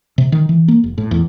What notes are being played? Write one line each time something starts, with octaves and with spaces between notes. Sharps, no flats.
C3
D#3
E3
A#3
F1
A2
E2